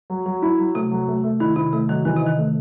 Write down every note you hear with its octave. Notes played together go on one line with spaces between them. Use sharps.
F#3
F#3
E4
F#3
C3 A3
F#3
A3
A3
D#3 E4
C3 E4
C3 A3
D#3 F#3
D#3 E3
C3 D#4
D#3
A3